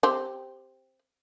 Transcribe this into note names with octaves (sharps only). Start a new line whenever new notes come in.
C4 G4